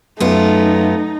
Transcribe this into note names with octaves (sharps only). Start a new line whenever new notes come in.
F#2 A3 B3 D#4 F4